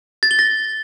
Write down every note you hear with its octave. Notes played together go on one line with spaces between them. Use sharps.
A6
G7
A#6